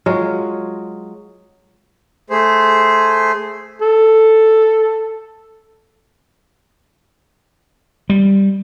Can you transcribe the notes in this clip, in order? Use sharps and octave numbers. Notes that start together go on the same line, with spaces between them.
F#3 G#3 F4
A3 G#4 C5
A4
G3